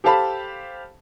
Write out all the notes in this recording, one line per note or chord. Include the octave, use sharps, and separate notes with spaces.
G4 A4 C5 F5 A5 B5